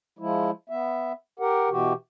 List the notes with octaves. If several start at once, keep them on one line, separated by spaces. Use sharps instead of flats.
F3 G#3 E4
B3 E5
G4 A#4 F#5
B2 E3 F#4 G4